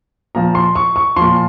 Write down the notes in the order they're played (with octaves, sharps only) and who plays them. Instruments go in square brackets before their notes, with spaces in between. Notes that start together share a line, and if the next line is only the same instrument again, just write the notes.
[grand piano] A#2 F3 A#5
C6
C#6
C#6
A#2 F3 C6